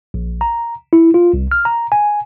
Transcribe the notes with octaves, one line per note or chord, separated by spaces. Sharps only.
A#1
A#5
E4
F4
C2
F6
A#5
G#5